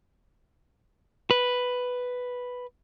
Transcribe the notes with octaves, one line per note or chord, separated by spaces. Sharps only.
B4